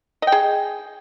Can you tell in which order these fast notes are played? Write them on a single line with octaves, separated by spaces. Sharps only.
D#5 G5 G#4